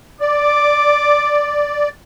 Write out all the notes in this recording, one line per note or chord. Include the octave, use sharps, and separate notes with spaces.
D5 D6